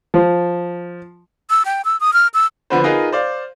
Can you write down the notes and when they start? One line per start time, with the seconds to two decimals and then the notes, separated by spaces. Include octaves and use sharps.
0.14 F3
1.50 E6
1.65 G5
1.85 E6
2.00 D#6
2.13 F6
2.34 E6
2.70 D3 F3 B3 B4 C5
2.84 D#4 F4 G#4 A#4 B4
3.12 C5 D5 F5